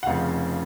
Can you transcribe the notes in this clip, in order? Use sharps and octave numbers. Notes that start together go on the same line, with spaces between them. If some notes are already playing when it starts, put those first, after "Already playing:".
F#5
F1 F2 C#3 F3 F5